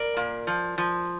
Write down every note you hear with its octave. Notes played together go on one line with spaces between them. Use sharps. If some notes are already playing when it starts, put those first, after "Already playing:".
Already playing: A#4 D5
A#2
F3
F3